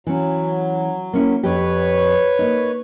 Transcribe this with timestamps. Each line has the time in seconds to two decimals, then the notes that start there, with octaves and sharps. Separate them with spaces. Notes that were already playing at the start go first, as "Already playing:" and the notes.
0.07 E3 F#3 C#4
1.13 A#3 C#4 E4
1.43 F2 G4 B4 C#5
2.39 A#3 D#4